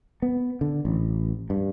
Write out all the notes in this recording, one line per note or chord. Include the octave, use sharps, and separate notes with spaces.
B3
D3
A1
G2